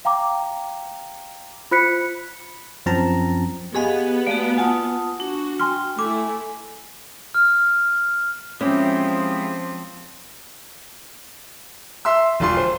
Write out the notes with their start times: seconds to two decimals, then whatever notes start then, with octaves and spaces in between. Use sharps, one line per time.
0.05 F5 G5 A#5 D6
1.71 F4 C5 B5 F#6 B6 C#7
2.86 F#2 F3 C4 A5 A#5
3.75 B3 G4 G#4 D#5 F5 G#5
4.27 A3 A#3 F#4 D5 F5
4.58 F4 F#5 G#5 A5 D#6
5.20 D4 F#4
5.60 G5 G#5 C6 F6
5.99 A3 E4 G#5 D6
7.34 F6
8.61 F3 G#3 C4 C#4 E4 G4
12.05 E5 C6 E6
12.40 E1 F4 C6
12.57 C5